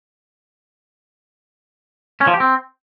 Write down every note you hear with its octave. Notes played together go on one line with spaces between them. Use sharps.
C#4
F3
G4
C4